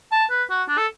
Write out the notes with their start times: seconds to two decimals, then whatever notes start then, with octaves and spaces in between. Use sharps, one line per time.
0.12 A5
0.30 B4
0.50 F#4
0.68 D4
0.78 A4